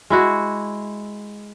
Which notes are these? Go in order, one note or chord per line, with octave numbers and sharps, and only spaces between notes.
G#3 E4 F#4